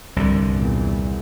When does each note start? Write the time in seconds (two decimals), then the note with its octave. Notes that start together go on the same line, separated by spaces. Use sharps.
0.16 C2 G2 D3
0.53 E2 A#2